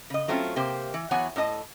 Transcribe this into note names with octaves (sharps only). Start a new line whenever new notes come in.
C#3 D#5
F#3 A3 C4 C#4 F4
C3 A#3 G4 C5
E3
E3 F#3 B3 C#5 F#5 G#5
A2 D4 D#5 A5